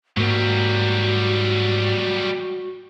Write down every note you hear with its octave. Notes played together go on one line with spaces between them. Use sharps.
G#2 F#3 G3 A#3 F#4